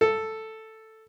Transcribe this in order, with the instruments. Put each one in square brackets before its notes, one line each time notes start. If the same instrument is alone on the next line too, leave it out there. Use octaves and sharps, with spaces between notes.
[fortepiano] A4